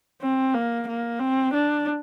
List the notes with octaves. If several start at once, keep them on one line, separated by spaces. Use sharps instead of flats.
C4
A#3
A#3
C4
D4